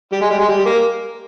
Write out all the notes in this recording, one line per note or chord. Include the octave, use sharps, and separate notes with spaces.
G3
G#3
G3
G#3
G3
A#3